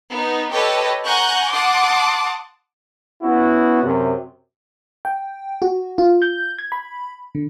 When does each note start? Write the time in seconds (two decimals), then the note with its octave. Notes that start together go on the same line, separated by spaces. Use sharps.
0.11 B3 D#4
0.51 G4 A4 B4 C#5 D#5
1.05 F#5 G#5 A#5 C#6 F#6 G6
1.50 F#5 A5 C6 D6 D#6
3.22 B3 C#4 E4 F#4
3.83 F#2 C3
5.05 G5
5.62 F#4
5.98 F4
6.22 G6
6.59 G#6
6.72 B5
7.35 D3